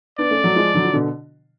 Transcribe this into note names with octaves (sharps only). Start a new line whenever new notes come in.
B3 D4 D5
A3 C#4
F#3 A3
F3 G#3
D3 F#3
F3
B2 D3